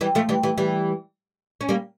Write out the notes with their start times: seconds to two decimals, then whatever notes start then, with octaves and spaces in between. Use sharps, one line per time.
0.01 E3 G3
0.15 F3 A3
0.29 E3 G3
0.43 E3 G3
0.58 E3 G3
1.61 C#4
1.69 G3 A#3